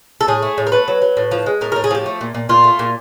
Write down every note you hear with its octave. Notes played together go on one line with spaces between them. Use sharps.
A4
A2 G#4
A3
A2
A#4
A3 B4
F#3
F#3
A2
F3
G#3
A2 A#4
A2 A#4
G#4
F3 G4
A3
A#2
A#2
A#2 F4
A3
A#2